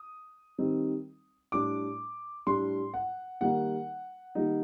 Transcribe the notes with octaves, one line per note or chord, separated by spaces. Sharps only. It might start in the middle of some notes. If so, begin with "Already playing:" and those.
Already playing: D#6
D#3 G3 C4 D#4
A2 G3 D4 D6
A2 G3 D4 C6
F#5
D#3 G3 A#3 D#4 F#5
D#3 G3 A#3 D#4